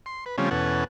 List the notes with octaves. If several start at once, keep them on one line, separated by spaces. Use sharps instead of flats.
C6
B4
C#3 F3 G3 A3 C4 C#4
E2 B2 C#4 A4 F#5